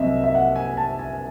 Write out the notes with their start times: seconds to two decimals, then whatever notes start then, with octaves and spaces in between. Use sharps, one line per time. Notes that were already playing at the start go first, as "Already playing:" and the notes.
Already playing: C2 C3 F#3 C4 D#5 E5
0.24 E5
0.35 F#5
0.56 G#5
0.77 A5
0.99 G#5